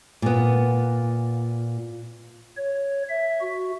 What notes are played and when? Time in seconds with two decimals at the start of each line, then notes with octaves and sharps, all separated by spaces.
0.22 A#2 B3
2.57 C#5
3.09 E5
3.41 F#4